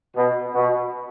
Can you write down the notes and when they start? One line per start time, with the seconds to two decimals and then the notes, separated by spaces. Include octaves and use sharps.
0.16 B2
0.54 B2